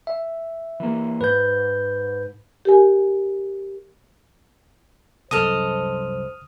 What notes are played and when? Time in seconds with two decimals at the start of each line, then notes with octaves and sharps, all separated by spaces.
0.07 E5
0.80 E3 A#3
1.21 G#2 B4 G6
2.65 G4 A#4 G#5
5.31 C2 F#2 A4 C5 D#5 D#6 F6